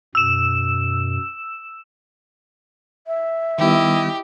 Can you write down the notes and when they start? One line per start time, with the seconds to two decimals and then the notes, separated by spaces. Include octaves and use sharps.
0.15 F#2 B2 E6 E7
3.07 E5
3.58 D#3 G3 B3 E4 G4 D#5